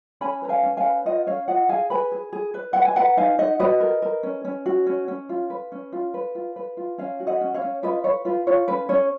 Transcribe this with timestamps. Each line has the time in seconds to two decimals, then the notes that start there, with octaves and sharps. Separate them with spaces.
0.21 C#4 G#5 B5
0.42 B4 A#5
0.49 F5 G#5
0.63 C#4
0.77 F5 G#5
0.85 B4
1.05 F4 D#5 F#5
1.26 C#4 C#5 F5
1.48 F4 D#5 F#5
1.69 G#4 F5 G#5
1.90 B4 G#5 B5
2.12 G#4
2.33 G#4
2.54 B4
2.73 B4 F#5
2.85 G#5
2.96 B4 F#5 A#5
3.17 D#4 F5 G#5
3.38 D#4 D#5 F#5
3.60 F#4 B4 D#5
3.80 A#4
4.02 A#4
4.23 C#4
4.45 C#4
4.66 F#4
4.86 C#4
5.08 C#4
5.29 F4
5.50 B4
5.72 C#4
5.92 F4
6.14 B4
6.35 F4
6.56 B4
6.77 F4
6.98 C#4 C#5 F5
7.20 F#4
7.27 D#5 F#5
7.41 C#4
7.54 C#5 F5
7.62 C#4
7.83 F4 B4 D#5
8.04 B4 C#5
8.25 F4 B4
8.47 F4 C#5
8.68 C#4 B4
8.89 C#4 C#5